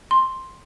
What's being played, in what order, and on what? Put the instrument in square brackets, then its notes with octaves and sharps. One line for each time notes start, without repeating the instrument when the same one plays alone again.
[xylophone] C6